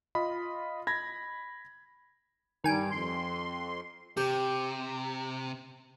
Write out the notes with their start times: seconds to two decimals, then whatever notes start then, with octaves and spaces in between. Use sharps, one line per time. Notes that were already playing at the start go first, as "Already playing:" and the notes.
0.15 F4 D#5 B5
0.87 B5 G#6 A#6
2.64 G2 D#3 G3 G#5 D7
2.91 F2 C6
4.17 C3 G4